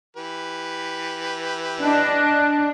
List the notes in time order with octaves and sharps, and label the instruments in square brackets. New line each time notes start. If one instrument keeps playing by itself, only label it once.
[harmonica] E3 G4 B4
[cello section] D4 [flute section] D#5 A5 F#6